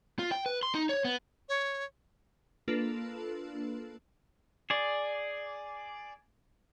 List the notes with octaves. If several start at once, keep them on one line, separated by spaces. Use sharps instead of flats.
F4
G5
B4
C6
D#4
C#5
B3
C#5
A#3 D4 F4 A4 B4
G#4 D5